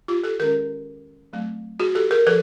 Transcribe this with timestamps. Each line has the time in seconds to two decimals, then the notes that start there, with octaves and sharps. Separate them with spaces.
0.08 F4 G4
0.24 G4 A4
0.39 D#3 G#3 C#4 G#4 A#4
1.33 F#3 A3 C4
1.80 F#4 G#4
1.95 G4 A4
2.11 G#4 A#4
2.27 F3 A4 B4